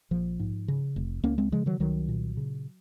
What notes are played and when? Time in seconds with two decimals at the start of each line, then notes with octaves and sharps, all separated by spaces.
0.11 A#1 F3
0.40 G#2
0.68 C#3
0.96 F1
1.23 C#2 A#3 C#4
1.38 G#3 C4
1.52 C#3 F3 G#3
1.66 D#3 F#3
1.80 C2 D#3 F#3
2.09 A#2
2.37 C#3